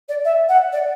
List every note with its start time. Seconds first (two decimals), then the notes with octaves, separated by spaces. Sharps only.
0.08 D5
0.25 E5
0.48 F#5
0.72 D5